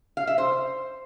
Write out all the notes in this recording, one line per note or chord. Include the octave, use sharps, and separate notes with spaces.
F5
E5
C5